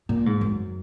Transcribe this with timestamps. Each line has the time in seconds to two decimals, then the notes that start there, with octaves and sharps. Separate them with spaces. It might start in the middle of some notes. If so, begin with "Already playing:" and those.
0.09 A#2
0.26 G#2
0.41 F#2